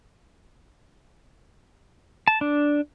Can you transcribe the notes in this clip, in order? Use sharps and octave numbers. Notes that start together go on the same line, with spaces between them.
A5
D4